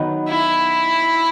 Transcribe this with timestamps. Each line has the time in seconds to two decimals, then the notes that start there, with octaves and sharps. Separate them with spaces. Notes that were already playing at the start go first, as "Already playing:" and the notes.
Already playing: D#3 F#3 B3
0.28 E4